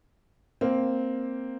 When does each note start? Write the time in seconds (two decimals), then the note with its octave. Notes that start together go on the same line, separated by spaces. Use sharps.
0.61 A#3 C4